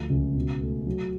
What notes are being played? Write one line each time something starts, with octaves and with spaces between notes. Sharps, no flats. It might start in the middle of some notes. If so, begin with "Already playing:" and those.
Already playing: D2 F3
C#2
B2
A3
F#3